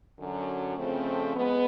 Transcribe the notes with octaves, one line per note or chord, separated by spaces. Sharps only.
F#2 D3 F#3
F2 C#3 F3 A3 C4
G#3 B3